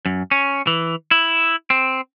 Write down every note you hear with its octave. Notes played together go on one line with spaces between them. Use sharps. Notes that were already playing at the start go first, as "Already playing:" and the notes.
F#2
C#4
E3
E4
C4